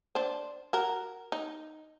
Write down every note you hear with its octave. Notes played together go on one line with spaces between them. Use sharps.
D4 C5
F#4 A#4
D#4